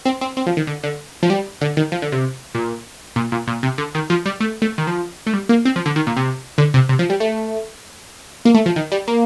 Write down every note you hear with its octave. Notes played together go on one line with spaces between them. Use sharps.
C4
C4
C4
F3
D#3
D3
D3
F3
G3
D3
D#3
F3
D3
C3
A#2
A#2
A#2
A#2
C3
D3
D#3
F3
G3
A3
A3
D#3
F3
A3
G3
A#3
C4
F3
D3
D#3
A#2
C3
D3
C3
C3
F3
G3
A3
A#3
A3
F3
D#3
G3
A#3